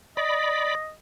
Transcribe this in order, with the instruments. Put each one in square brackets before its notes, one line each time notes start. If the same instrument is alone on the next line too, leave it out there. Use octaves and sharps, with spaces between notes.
[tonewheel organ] D5 B5 [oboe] D#5